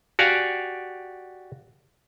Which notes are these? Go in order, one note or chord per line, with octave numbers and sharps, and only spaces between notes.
F#4 G4 D5 F5 G#5